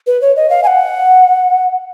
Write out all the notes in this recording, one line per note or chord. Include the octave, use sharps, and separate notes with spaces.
B4
C#5
D#5
F5
G#5
F#5